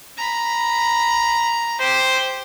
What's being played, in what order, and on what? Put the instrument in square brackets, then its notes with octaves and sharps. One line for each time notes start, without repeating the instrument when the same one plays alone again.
[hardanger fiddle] A#5 B5
[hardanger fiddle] G4 [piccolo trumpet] C5